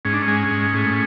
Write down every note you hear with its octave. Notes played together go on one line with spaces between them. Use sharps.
G#2 C#4
D4
C#4
G#3
G#2
A2